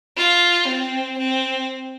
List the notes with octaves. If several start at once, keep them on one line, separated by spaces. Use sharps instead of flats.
F4
C4
C4